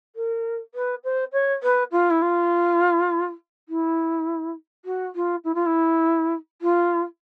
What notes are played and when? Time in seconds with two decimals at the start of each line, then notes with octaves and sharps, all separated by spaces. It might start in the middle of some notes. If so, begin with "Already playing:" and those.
0.16 A#4
0.75 B4
1.04 C5
1.33 C#5
1.63 B4
1.92 F4
2.10 E4
2.22 F4
3.69 E4
4.85 F#4
5.15 F4
5.44 E4
5.55 F4
5.66 E4
6.62 F4